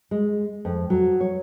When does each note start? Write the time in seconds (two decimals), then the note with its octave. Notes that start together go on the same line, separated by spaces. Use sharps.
0.11 G#3
0.65 F2
0.90 F#3
1.20 C#5